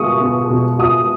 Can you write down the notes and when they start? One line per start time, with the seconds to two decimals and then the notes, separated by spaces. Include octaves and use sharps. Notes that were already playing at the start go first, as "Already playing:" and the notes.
Already playing: B2 G#3 F4 C#6 D#6
0.20 B3
0.50 B2
0.79 F4 D#6